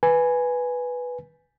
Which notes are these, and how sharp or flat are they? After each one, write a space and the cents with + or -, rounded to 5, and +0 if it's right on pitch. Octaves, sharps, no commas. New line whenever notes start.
B4 +0 G#5 +0